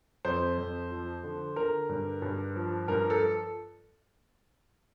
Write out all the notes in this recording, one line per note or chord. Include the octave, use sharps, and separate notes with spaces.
F2 C5
F2
F3
D3
D3 A#4
G2
G2
F3
G2 A#4
A4